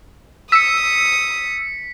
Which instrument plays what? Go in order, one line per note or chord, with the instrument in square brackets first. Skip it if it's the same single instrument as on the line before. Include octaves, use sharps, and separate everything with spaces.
[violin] D#6 [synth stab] E6 [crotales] B6 C#7